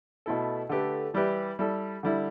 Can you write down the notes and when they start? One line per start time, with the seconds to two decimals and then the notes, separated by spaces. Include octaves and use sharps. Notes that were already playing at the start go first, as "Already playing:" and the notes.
0.26 B2 A3 E4 A4
0.69 D3 A3 G4 B4
1.14 E3 G3 E4 G4 B4
1.59 G3 E4 A4
2.03 D3 G3 E4